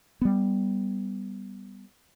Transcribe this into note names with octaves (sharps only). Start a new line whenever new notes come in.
G3 B3